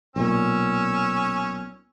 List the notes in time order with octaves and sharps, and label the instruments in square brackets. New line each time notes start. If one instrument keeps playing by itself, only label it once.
[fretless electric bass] B1 A#2 [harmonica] C#4 E6